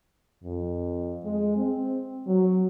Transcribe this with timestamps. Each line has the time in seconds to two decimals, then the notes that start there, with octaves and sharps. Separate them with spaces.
0.44 F2
1.25 G#3
1.56 C4
2.27 F#3